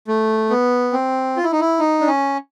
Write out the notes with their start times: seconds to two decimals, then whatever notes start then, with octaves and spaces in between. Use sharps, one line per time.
0.08 A3
0.50 B3
0.93 C4
1.37 F4
1.44 E4
1.52 D#4
1.60 E4
1.79 D#4
2.01 D4
2.07 C#4